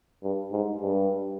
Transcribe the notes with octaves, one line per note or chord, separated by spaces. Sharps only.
G2
G#2
G2